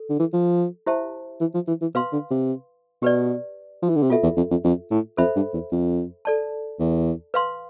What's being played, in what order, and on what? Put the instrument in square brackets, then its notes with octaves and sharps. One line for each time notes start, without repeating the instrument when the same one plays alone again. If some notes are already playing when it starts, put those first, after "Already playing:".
Already playing: [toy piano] A4
[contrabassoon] D3
E3
F3
[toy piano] E4 G4 C5 E5 A5
[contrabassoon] E3
F3
E3
E3
[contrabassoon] B2 [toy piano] B4 F5 C6
[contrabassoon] D3
C3
[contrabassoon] B2 [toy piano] G4 B4 D5
[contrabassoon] F3
E3
D3
C3
[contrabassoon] B2 [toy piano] F4 A4 E5
[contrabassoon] E2
F2
F2
F2
A2
[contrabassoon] F2 [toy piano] A4 C5 E5 B5
[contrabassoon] G2
E2
F2
[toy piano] A4 D5 A5
[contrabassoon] E2
[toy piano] B4 F5 C6